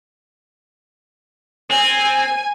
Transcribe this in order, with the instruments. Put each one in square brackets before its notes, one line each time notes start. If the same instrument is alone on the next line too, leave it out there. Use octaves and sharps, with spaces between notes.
[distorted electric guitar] C4 [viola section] G#5